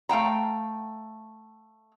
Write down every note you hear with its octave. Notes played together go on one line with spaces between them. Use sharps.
A3 F5 G5 A#5